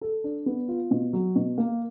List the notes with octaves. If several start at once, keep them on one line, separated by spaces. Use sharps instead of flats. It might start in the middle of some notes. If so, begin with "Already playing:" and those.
A4
D4
B3
F4
B2
F#3
B2
A#3